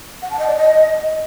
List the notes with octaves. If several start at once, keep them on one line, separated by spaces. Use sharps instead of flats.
F#5
A5
D#5
D5
D#5